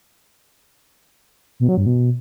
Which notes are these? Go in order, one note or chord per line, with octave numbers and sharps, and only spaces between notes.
B2
F#3
G2
B2